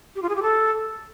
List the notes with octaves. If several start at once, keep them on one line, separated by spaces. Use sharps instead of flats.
G4
F4
G#4
G4
A4